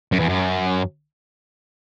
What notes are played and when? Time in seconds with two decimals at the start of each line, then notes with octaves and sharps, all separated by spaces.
0.12 F#2
0.20 E2
0.29 F#2